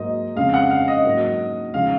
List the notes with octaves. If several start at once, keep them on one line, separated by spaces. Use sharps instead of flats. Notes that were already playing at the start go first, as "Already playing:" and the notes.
Already playing: G#2 F#3 A#3 D#4 D#5
F2 C#3 G#3 F5
F#5
F5
D#5
G#2 F#3 A#3
C#3 F3 G#3 D#4 F5